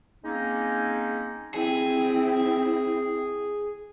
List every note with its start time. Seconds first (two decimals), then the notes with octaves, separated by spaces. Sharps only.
0.23 G#3 A#3 C4 C#4 D#4
1.54 C4 E4 G#4